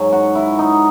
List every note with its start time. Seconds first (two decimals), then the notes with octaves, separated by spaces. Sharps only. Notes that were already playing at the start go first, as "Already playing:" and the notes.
Already playing: G#2 F#3
0.12 F#4
0.35 E4
0.59 D#4